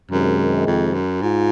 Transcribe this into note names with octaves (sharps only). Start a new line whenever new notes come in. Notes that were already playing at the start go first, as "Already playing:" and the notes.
F#2 C3 D#3 G#3
F2
F#2
G#2 F4